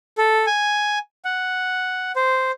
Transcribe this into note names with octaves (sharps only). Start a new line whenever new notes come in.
A4
G#5
F#5
C5